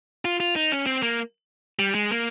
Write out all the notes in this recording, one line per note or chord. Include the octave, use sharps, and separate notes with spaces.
F4
F4
D#4
C#4
C4
A#3
G3
G#3
A#3